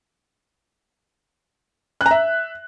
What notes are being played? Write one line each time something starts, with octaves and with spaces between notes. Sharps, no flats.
F#6
A#5
E5